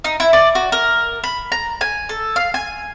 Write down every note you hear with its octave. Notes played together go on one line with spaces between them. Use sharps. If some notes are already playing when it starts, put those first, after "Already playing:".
D#4
E4
D5
F#4
A#4
B5
A#5
G#5
A4
F5
G#5